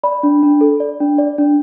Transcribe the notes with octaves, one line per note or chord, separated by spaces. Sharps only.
D5 B5
D4
D4
A4
D5
D4
D5
D4